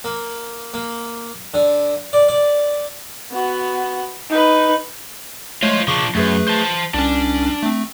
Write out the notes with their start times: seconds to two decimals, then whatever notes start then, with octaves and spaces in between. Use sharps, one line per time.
0.04 A#3
0.74 A#3
1.54 D3
2.13 D5
2.29 D5
3.31 B3 F#4
4.29 D#4 B4
5.62 G#3 A3 F4 C5 C#5
5.88 C#3 F3 D4 C#6 D6
6.15 F#2 A3 G#4 B4
6.48 C5 A5
6.94 C2 C#4 D4
7.63 A3 C4